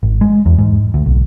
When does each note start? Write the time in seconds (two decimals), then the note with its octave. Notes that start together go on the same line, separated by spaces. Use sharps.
0.03 G#1
0.21 G#3
0.46 E2
0.59 G#2
0.94 D2
1.06 B1